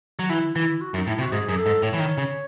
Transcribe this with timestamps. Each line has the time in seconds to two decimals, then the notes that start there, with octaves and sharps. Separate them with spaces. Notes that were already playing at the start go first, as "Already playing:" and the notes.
0.19 F#3
0.30 E3 E4
0.55 E3 E4
0.81 F#4
0.94 F#2
0.98 D#4
1.07 A2 E4
1.19 C3 F#4
1.32 G#2 G#4
1.49 F#2 G#4
1.57 A4
1.66 G#2
1.83 A2 C#5
1.93 E3
1.99 D#3
2.18 C#3